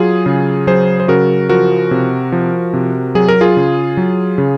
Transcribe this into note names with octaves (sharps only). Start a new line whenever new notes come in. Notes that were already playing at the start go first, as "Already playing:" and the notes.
Already playing: F#3 F4 G#4
C#3
F#3 G#4 C5
C5
C#3 F#4 A#4
F3 F#4 A#4
C3
F3
C3
F#3 G#4
A#4
F4 G#4
C#3
F#3
C#3